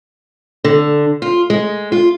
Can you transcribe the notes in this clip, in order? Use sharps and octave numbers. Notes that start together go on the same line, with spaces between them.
D3
F4
G#3
F4